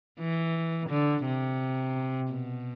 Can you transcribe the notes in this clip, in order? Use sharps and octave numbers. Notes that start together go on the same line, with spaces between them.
E3
D3
C3
B2